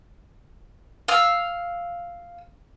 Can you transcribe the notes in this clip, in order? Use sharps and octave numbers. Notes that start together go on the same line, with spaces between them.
F5 E6